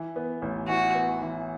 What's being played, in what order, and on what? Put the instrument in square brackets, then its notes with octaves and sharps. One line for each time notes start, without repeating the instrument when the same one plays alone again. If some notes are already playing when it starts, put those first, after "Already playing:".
Already playing: [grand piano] E3
B3
A1
[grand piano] E3 [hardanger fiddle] F#4
[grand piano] B3
E3